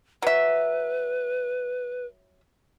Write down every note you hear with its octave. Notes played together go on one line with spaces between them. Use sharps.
F#3 B4 E5